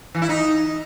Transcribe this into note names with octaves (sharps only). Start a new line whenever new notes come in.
E3
E4
D#4